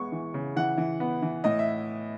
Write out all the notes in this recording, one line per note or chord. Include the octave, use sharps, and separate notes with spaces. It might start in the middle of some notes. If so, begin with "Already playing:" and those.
Already playing: E2 G#3 B3 C#6
E3
C#3
E3 F#5
E3
B3
E3
A2 D#5
E5